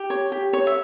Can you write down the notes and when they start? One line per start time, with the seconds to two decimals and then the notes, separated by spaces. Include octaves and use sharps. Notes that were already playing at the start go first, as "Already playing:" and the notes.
Already playing: G4
0.10 C#5
0.32 G4
0.53 C#5
0.67 E5